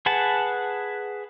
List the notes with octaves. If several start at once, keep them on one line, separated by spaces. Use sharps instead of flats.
G#4 B4 F#5 A5